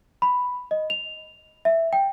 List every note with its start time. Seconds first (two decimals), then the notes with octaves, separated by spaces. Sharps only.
0.22 B5
0.71 D#5
0.90 F7
1.65 E5
1.93 G5